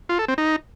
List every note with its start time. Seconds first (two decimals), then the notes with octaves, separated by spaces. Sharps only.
0.09 F4
0.19 A4
0.28 C4
0.38 D#4